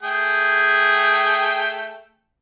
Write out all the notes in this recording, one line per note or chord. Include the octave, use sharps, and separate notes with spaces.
A3 G#4 G5